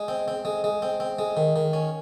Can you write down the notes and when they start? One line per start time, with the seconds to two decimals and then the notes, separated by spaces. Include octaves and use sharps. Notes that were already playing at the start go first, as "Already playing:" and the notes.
Already playing: G#3
0.08 C4
0.28 C4
0.45 G#3
0.64 G#3
0.82 C4
1.00 C4
1.19 G#3
1.37 D#3
1.56 D#3
1.73 C#4